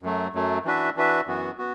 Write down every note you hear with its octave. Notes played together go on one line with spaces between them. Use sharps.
F#2 F#3 A3
F#2 F#3 A3
E3 D4 F#4 B4 E5
E3 D4 F#4 B4 E5
F#2 E3 B3 F#4
B3 F#4